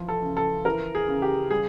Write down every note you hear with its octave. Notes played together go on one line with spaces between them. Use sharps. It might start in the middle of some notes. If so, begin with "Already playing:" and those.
Already playing: E3 F3
A4
C#3
A4
E3 A#4
G#4
C#3
G4
G3 G#4